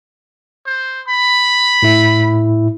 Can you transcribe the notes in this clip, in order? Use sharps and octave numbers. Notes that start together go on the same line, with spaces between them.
C5
B5
A2 E4